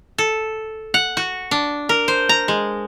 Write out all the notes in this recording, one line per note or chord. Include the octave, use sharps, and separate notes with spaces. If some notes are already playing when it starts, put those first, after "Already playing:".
A4
F#5
F#4
D4
A#4
C5
A#5
G#3